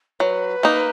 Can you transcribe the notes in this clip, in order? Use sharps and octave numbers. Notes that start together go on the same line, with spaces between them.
F#3 B4
A#3 D#4